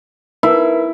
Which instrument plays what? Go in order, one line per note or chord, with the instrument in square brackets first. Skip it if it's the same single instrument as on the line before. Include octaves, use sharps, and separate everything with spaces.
[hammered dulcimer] E4 [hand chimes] A#4 B4